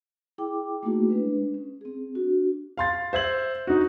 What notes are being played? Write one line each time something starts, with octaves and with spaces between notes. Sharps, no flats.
E4 G#4 G5 D6
A3 A#3 D#4 E4 F#4 G#4
G#3 C#4 D4 B4
C#4
C4 G#4
D4 F#4
F5 C6 A6
C5 E5 G#6 F#7
D#4 F#4